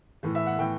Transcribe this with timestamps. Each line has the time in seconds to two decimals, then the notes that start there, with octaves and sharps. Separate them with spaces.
0.23 A2 E3
0.35 E5
0.46 F#5
0.58 A2 E3 G5